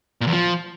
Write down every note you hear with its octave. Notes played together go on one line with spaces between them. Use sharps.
A#2
E2
F3